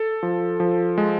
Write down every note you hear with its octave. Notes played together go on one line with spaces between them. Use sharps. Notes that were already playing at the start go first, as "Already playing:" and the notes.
Already playing: A4
F3
F3
G#3